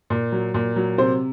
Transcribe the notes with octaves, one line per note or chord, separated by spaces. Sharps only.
A#2
F#3
A#2
F#3
C3 C5